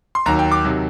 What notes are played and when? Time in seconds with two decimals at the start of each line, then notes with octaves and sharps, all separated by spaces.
0.15 C6
0.26 D#2 D#3 F#3 A#5
0.39 G5
0.51 D6
0.65 C3 D#3 F#3